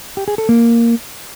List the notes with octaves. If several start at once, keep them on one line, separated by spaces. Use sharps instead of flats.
G4
G#4
A4
A#3